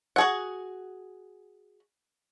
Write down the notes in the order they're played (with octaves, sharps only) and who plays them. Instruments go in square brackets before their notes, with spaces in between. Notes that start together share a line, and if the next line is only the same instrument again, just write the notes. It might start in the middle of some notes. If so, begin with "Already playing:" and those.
[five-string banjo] F#4 G#4 F#5